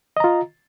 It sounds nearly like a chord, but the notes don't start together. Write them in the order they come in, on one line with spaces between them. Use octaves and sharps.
D#5 A#5 F4